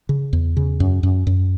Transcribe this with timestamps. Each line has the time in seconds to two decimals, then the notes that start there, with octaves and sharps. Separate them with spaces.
0.09 C#3
0.33 E2
0.57 C#3
0.80 F#2
1.03 F#2
1.27 F#2